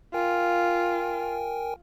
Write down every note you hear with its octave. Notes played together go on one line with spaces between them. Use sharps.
F4 A#4 G5 G#5